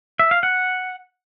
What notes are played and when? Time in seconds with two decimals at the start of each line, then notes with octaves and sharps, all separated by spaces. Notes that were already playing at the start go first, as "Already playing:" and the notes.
0.19 E5
0.31 F5
0.43 F#5